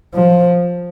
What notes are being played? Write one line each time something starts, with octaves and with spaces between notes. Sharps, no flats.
F3